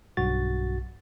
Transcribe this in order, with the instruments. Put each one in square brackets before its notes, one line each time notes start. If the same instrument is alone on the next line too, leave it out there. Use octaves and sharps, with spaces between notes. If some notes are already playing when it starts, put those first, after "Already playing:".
[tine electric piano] B1 G2 F#4 A6